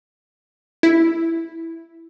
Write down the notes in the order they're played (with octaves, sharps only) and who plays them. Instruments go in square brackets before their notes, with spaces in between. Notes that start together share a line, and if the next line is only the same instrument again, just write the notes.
[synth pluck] E4